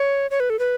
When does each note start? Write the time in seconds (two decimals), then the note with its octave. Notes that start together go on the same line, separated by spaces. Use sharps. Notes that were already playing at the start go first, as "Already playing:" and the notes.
Already playing: C#5
0.31 C#5
0.40 B4
0.50 A4
0.59 B4